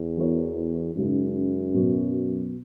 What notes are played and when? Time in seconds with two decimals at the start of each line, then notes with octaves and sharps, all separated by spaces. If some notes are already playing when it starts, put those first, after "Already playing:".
Already playing: E2
0.17 E3 B3 F#4 A#4 C#5
0.95 F#2 C#3 G#3 D#4
1.74 B2 F#3 B3 F#4